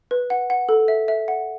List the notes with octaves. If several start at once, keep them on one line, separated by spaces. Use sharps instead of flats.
B4
F#5
F#5
A4
E5
E5
F#5